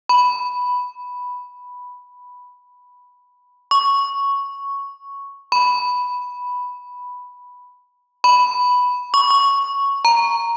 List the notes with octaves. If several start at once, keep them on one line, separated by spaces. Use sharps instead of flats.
B5
C#6
B5
B5
C#6
C#6
A#5